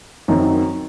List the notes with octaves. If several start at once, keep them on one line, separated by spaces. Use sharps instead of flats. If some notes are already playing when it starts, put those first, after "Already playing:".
F#2 D#3 F#3 C4 D#4